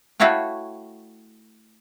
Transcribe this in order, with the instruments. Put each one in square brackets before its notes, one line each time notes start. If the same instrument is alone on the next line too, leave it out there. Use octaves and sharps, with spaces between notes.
[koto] A3 E4 F#4 C#5 F5 G5